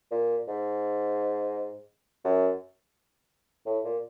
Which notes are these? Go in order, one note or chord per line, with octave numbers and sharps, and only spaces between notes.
A#2
G#2
F#2
A2
A#2